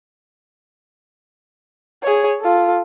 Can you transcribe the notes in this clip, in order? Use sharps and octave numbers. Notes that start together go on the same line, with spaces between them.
G#4 C#5
F4 A4